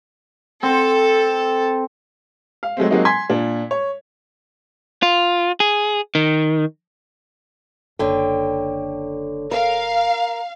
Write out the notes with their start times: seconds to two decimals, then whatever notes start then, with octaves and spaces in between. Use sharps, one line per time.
0.63 C4 A4
2.63 F5
2.77 F#3 G#3 A3 C4
2.90 F#3 G#3 A#3 C4 D#4 F#4
3.05 G#5 C6 G#6 B6
3.30 A#2 D4
3.71 C#5
5.03 F4
5.60 G#4
6.15 D#3
7.99 F#1 D3 A4 C#5 G5
9.51 A#4 F5